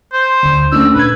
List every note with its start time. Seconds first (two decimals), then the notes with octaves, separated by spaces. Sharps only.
0.13 C5
0.43 D2 D3
0.72 A3 C#4 D4 E6
0.95 A#2 B4 G#6